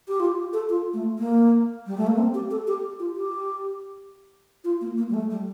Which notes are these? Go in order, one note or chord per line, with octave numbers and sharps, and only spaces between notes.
G4
F4
A4
F4
A3
A#3
G3
A3
A#3
C4
G4
A4
G4
F4
G4
F4
A#3
A#3
G3
A3
G3